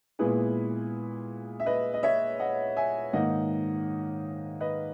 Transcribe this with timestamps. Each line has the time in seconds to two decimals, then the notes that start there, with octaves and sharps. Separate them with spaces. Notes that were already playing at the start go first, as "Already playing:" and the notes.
0.19 A#2 G#3 B3 E4 G#4 B4
1.60 E5
1.66 B4 D#5
1.94 D#5
2.03 C#5 E5
2.40 D#5 F#5
2.77 E5 G#5
3.13 G#2 D#3 A#3 D#4 D#5 F#5
4.61 B4 D#5